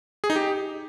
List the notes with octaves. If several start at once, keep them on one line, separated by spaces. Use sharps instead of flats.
G#4
D#4
G4